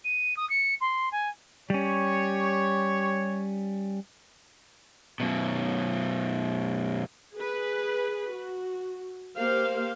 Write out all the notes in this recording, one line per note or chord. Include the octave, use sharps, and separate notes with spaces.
D#7
D#6
C#7
C6
G#5
G3 C#4 G4 C#5
F#2 B2
G#4 B4
F#4
A#3 G4 C5 F5